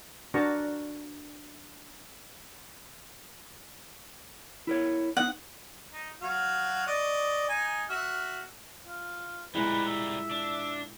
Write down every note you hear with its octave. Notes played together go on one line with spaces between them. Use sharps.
D4 F#4 A#4 A5 A#5 C#6
E4 A#4 C#5
B3 D#4 F#5
D#4
F#3 F#4 F5
D5 D#5 C#6
D#4 G#5
F#4 E5 F6
F4
A#2 G3 G#3 E4 A#4 B4
E5
D4